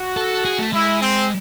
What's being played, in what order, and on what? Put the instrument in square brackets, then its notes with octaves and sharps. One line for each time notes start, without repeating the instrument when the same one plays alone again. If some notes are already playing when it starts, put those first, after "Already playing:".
Already playing: [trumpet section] F#4
[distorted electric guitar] A4
G#4
A3
[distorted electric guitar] G#3 [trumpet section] E4
[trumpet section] C4